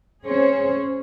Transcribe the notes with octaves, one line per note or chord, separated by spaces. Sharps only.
C#4 G#4 C5 C#5